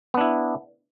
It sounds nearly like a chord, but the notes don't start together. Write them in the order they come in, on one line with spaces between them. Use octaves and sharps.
B3 D4 E4